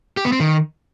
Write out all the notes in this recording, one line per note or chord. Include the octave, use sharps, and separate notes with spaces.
G4
B3
C4
D#3